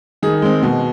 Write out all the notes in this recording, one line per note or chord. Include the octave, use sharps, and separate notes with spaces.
D#3 G#4
G#3 C4
B2